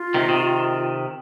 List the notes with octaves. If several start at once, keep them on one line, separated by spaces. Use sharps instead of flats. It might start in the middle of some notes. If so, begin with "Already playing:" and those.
Already playing: F4
C3 D#3
C3 D#3